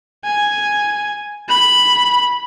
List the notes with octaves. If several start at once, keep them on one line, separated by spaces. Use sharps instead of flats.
G#5
B5